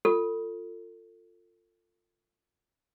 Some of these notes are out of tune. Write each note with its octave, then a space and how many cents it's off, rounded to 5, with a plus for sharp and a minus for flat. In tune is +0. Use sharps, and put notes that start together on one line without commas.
F4 +0 A4 +30